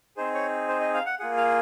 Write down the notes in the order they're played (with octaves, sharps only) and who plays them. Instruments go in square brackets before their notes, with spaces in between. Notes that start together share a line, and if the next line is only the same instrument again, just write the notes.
[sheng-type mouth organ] C4 D#4 G#4 C5
C#5
C5
D#5
F5
F#5
A#3 F4 G#4 F#5
F5